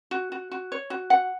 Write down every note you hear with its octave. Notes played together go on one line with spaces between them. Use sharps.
F#4
F#4
F#4
C#5
F#4
F#5